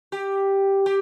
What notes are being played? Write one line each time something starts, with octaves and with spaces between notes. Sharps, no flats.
G4
G4